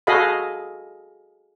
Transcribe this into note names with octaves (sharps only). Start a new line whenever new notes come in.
F#4 G#4 A4 D#5 F5 B5